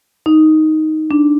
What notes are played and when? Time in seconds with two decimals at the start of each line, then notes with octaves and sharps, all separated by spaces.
0.26 D#4
1.11 D4